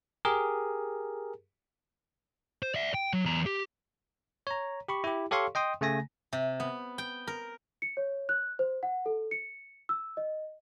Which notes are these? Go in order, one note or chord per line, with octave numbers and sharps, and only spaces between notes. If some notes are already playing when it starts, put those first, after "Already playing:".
G4 G#4 A#4
C5
D5 E5
G5
F#3
E2 A#5
G4
C#5 A#5
G4 B5 C#6
E4 G4
G4 A4 C#5 F5 C6 C#6
D#5 G5 C6 D#6
C#3 A3 G#5 A#6
C3
B3
G5
A#4
C#7
C#5
F#6
C5
F#5
A4
C#7
E6
D#5